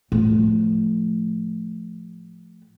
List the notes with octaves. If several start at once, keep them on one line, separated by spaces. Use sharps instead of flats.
A2 F3